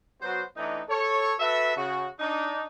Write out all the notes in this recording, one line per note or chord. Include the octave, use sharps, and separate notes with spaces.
F#3 B3 F#4 C5
E3 A3 D4 D#4
A4 C#5
F#4 A4 B4 E5
C#3 F#4
D4 D#4